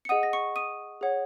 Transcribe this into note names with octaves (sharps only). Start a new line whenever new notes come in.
C#7
G#4 D#5 F#5 D#6 D#7
A#6
C#6 C#7
D#6 D#7
G#4 C#5 F#5